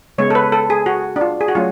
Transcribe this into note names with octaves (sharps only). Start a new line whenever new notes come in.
C#3 G#3 B3 C#5
A4
B4
A4
G#4
F#4
D4
F4
G#4
F#4
F#3 A3 C#4 F4